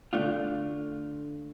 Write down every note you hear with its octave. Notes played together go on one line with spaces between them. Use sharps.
D3 A3 D4 F4